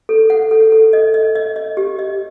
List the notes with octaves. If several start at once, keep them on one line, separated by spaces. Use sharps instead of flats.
A4
F#5
A4
A4
D#5
D#5
D#5
D#5
G4
D#5